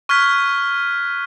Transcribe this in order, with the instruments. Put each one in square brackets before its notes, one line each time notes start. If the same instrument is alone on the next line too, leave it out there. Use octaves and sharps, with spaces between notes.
[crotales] C#6 F6 F#6 G#6 B6